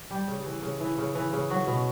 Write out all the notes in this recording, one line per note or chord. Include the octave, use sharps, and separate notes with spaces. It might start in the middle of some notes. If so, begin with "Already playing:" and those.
Already playing: E3
G3 G4
C#3
E3
C#3
E3
C#3
E3
C#3
F#3 F#4
B2